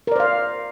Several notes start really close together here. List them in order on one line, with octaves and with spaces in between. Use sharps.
A#4 D5 C5 F5